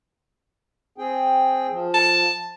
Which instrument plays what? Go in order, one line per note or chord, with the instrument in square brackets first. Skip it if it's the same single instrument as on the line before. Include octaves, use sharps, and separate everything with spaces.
[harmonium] C4 G#4 G5
F3
[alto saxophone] A5